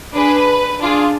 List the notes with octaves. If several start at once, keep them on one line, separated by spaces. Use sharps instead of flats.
D4 G#4 B4
D4 F4 G#4